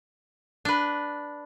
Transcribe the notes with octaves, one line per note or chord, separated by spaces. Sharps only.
D4 B4